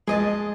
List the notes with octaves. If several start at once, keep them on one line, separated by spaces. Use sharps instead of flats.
G#3 G#4 D#5 A5